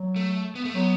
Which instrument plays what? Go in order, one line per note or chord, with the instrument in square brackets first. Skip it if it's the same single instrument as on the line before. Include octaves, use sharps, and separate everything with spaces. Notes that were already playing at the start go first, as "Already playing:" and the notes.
Already playing: [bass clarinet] F#3
[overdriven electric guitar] A3
B3
A3
[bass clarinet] F#3 [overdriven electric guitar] B3